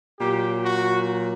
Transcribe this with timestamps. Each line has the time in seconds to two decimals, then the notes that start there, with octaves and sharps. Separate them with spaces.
0.19 A#2 F#3 G4
0.65 F#4